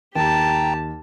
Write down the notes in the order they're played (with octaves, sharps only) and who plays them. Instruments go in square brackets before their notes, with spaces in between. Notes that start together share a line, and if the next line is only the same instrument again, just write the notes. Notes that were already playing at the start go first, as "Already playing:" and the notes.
[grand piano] D#2 [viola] G4 A5 [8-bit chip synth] G5 A#5